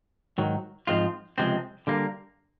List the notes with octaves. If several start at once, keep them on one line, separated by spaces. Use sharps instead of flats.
G#2 D#3 F#3
G#2 F3 G#3 C4 F4
C#2 C3 F3 G#3 C4
D3 G3 A#3